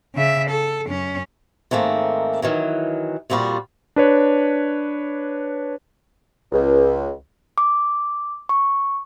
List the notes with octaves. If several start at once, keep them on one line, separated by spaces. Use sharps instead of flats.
C#3 E5
A4
F#2 C#4
G#2 D#3 A3 A#3 C4
D#3 E3 F#3
F2 A#2 G3 F4 F#4
D4 B4 C#5
C#2
D6
C#6